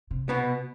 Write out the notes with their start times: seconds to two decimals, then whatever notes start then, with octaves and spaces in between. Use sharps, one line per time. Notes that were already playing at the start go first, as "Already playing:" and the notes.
0.11 C3
0.29 B2 B3